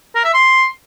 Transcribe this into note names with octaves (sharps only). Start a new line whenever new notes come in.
A#4
E5
C6